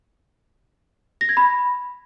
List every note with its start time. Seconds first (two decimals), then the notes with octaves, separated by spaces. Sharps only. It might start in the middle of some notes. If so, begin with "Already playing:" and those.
1.21 A#6
1.29 G#6
1.37 B5